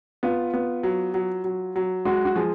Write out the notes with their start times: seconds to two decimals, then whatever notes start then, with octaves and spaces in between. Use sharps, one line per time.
0.23 B3 F4
0.54 B3
0.83 F#3
1.14 F#3
1.44 F#3
1.76 F#3
2.05 G#3 F#4
2.25 F#4
2.36 F3 G#4